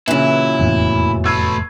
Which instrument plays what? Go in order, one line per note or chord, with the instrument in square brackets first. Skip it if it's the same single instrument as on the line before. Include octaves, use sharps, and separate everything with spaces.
[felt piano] A#2 C#3 [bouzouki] E3 F#3 [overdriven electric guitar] E4
[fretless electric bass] F1 E2 A2
[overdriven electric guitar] A3 B4 [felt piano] E6 G#6 C7